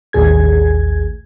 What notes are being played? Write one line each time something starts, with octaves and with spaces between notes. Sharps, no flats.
A1 D#2 A2 G#4 G#6